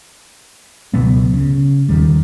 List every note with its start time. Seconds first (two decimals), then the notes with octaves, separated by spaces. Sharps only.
0.94 C#2 B2 F#3 B3
1.34 C#3
1.89 D#2 D#3 G3